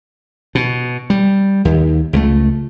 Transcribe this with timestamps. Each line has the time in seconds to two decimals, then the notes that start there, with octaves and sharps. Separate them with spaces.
0.55 B2
1.10 G3
1.65 D#2
2.13 C#2 F#3 A3